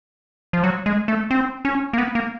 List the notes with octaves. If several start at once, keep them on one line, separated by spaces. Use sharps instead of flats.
F3
F#3
G#3
A3
C4
C#4
A#3
B3
A#3